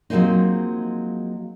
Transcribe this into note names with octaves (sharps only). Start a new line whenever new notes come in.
F3 F#3 G#3 A#3 C4 D#4